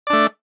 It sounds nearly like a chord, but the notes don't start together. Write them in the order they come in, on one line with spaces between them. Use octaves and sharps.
D5 D4 A3